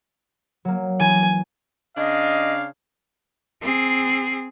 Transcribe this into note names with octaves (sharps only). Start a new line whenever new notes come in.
F#3 A#3
E3 G#5
C#3 D4 D#5 F5
C4 G#4